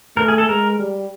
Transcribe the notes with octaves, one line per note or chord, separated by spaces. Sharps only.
A3 A#4
G#4
A4
G#3 A#4
G3